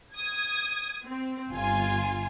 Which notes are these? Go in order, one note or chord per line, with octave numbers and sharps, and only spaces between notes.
D#6 G#6
C4
G1 F4 G#5